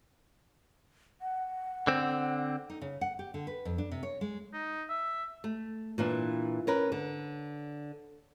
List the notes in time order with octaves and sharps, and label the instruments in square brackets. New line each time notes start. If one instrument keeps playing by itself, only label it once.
[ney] F#5
[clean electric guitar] D3 C4
[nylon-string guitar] D#4
C#3
F#5
G4
D3
B4
F2
D4
C3
C#5
G#3
[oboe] D#4
E5
[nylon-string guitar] A3
A#2 E3 D4
C#4 A#4 B4
D3